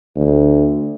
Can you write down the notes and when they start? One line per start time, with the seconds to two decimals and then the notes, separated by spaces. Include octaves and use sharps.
0.16 D2